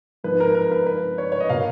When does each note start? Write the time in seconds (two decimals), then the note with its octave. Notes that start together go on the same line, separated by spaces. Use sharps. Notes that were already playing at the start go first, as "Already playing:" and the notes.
0.24 G#2 F3 B3 B4
0.40 A#4
0.55 A#4
0.72 B4
0.87 B4
1.18 C#5
1.32 C#5
1.40 D#5
1.49 B2 A#3 F5